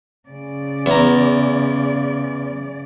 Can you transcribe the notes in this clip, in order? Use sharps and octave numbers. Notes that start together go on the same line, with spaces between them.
C#3 D5
E2 A#5